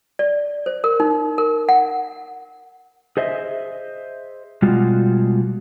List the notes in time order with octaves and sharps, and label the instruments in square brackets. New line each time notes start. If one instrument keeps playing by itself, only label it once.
[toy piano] D5
C5
A#4
D#4
A#4
F#5
[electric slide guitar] G#4 C5 D#5 E5
B2 G3 G#3 F4 F#4